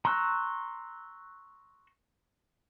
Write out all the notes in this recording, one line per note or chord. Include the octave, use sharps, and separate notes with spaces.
A#5 C6 C#6 E6 F#6